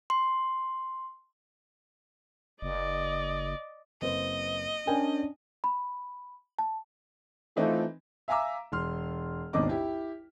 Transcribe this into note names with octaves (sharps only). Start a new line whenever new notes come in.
C6
F#1 D5 D#5
F#1 C4 B4 D#5
C#4 D4 A#4 G5 G#5
B5
A5
E3 A3 C4 D#4 F4
E5 F5 G#5 A#5 D6 E6
E1 C6 F6
G#1 D#2 B2 D4 D#5 D6
E4 G4